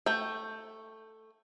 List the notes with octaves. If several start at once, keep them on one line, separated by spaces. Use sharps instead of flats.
A3 G5